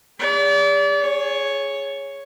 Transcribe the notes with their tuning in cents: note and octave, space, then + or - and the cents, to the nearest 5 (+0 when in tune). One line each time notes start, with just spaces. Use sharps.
G#4 -45 D5 -35
G#4 +0 C#5 +0